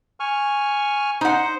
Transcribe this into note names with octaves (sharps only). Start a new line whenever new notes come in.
G#5 C#6 F6
D#4 C5 F#5